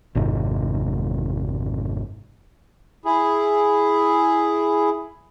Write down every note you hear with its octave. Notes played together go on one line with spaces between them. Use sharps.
G#1 F2 G#2 C3
E4 G#4